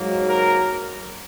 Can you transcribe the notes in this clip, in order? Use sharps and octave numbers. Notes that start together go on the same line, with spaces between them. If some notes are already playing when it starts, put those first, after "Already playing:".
Already playing: G#2 F#3 A#3
A#4